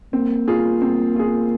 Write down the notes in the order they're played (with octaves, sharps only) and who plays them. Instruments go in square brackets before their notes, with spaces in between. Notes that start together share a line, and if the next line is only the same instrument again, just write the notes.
[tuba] A#3 [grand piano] C4
[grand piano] F4 G#4
C4
F4 G#4